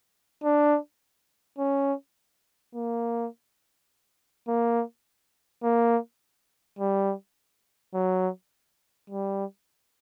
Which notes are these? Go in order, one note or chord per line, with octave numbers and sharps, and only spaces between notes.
D4
C#4
A#3
A#3
A#3
G3
F#3
G3